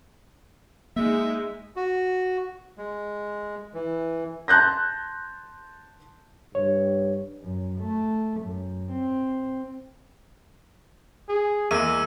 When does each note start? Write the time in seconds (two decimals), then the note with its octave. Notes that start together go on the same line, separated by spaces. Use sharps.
0.96 G#3 A#3 D#4 E5
1.76 F#4
2.78 G#3
3.74 E3
4.48 A5 C6 F#6 G6 A#6
6.55 G2 C#5
7.42 F#2
7.79 A3
8.41 F#2
8.92 C4
11.29 G#4
11.71 E2 G#3 A#3 E5 E6 D#7